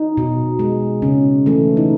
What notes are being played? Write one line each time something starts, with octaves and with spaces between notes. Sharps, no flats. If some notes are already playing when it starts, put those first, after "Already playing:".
Already playing: D#4
B2
G#3
C#3 C#4
E3 A3
D#4